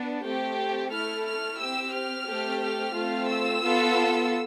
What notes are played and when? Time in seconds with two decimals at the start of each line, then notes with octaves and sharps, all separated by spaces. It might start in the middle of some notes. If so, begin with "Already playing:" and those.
Already playing: B3 D4
0.25 A3 C4 G4
0.92 A3 E4 A4 F6
1.26 F6
1.60 C4 G4 E6
1.94 F6
2.27 A3 C4 G4
2.61 F6
2.95 A3 C4 F4
3.30 E6
3.64 B3 F4 A4